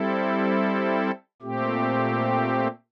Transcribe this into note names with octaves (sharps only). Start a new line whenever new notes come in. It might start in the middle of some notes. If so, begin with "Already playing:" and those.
Already playing: G3 C4 E4 A4
A#2 A3 C4 G4